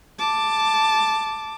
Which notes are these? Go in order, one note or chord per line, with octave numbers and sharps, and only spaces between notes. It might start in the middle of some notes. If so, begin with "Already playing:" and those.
A5 D6